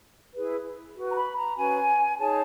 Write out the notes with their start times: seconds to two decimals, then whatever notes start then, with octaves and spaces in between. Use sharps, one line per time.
0.34 E4 G#4 B4
0.96 F#4 B4
1.10 A#5
1.16 B5
1.37 A#5
1.57 C#4 F#4 B4 G#5
2.19 D#4 G#4 C#5 A5